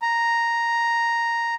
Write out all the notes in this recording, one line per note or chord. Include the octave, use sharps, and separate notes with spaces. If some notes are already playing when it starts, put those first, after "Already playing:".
A#5